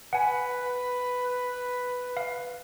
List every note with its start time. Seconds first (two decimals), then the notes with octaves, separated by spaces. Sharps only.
0.13 B4 F#5 G#5
2.17 F5